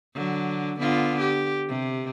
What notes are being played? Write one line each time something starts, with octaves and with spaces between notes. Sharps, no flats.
D3 F#3
D3 B3 F4
G4
C3